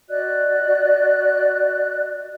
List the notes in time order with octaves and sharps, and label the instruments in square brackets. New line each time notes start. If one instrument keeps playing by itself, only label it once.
[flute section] F#4 D5 D#5 F#6